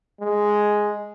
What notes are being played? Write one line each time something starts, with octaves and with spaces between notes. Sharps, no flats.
G#3